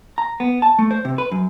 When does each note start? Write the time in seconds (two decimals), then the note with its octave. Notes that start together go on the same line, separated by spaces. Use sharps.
0.18 A#5
0.40 B3
0.62 A5
0.79 A3
0.91 C5
1.05 C3
1.18 B4
1.32 F#2